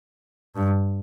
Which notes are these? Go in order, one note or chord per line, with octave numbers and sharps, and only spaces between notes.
G2